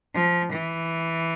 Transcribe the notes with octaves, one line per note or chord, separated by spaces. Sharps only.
F3
E3